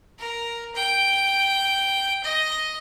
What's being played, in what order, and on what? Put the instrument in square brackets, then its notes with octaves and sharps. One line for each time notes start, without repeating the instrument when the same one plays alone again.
[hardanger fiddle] A#4
G5
D#5